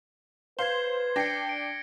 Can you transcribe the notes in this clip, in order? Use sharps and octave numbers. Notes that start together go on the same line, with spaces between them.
B4 C5 F5 G#6 C7 G7
D4 G5 A#6 C7 C#7
D7